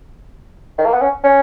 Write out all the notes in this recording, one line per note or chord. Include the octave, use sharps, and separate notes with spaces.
D#3
A#3
B3
C#4
C#4